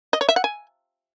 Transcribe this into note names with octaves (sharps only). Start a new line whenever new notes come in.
D#5
C#5
E5
F#5
G#5